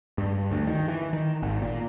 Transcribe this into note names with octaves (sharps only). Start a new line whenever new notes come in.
G2
D2
D#3
E3
D#3
G#1
A#2